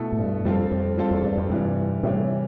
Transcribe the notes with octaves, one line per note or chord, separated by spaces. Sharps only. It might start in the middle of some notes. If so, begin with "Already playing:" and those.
Already playing: B2 A3 E4 A4
A2
G2
F2 G3 C4 F4 A4
F2
G3 C4 F4 A4
E2
G2
F2
G2 C3 E3 G3
A2 C3 E3 G3